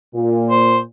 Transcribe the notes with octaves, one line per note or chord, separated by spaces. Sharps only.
A#2
C5